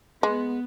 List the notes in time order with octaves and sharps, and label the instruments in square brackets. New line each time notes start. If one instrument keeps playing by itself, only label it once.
[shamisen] G#3 [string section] B3